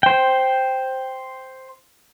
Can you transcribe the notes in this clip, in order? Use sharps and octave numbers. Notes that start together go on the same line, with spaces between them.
C5 G5